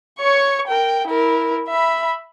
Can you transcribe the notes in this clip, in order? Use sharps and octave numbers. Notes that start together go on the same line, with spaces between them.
C#5 C#6
A#4 G5
E4 A#4
E5 B5